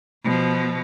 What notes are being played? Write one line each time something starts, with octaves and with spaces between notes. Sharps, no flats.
B2 F3